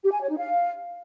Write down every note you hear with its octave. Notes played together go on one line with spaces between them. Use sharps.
G4
G#5
C#5
D#4
F5